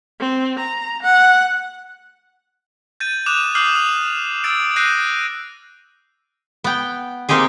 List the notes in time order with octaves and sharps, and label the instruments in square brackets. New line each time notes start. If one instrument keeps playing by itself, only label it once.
[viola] C4
A#5
F#5
[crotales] G6 A6 D#7
D6 D#6 F#6 E7 F7
D6 D#6 F6 G6 C7 F#7
D#6 F6 E7 F7
E6 A6 D7
E6 F#6 G6 A#6 C7 D#7
[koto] B3 G5
A#3 C4 D#4 G4 G#4